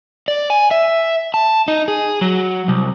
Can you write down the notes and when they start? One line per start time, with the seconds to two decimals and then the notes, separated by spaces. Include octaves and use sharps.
0.28 D5
0.50 G#5
0.71 E5
1.34 A5
1.68 D#4
1.88 G#4
2.21 F#3
2.68 C2